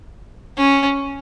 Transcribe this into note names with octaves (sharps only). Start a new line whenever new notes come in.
C#4